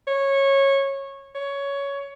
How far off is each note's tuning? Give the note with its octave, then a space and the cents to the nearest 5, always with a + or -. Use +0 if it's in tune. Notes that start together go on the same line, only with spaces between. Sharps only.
C#5 -15
C#5 +15